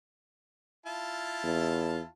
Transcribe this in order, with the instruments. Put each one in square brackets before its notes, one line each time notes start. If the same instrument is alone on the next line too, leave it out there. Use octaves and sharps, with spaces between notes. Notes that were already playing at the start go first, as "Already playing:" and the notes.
[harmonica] E4 F4 A5
[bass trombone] E2